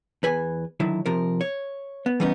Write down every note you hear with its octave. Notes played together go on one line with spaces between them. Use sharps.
E2 B4 G#5
D3 D#3 F#3 E4
C3 F3 A#4
C#5
B3
E3 G3 B3 C#4 D#4